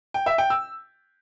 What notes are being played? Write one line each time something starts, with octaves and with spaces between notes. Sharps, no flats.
G5
E5
G5
E6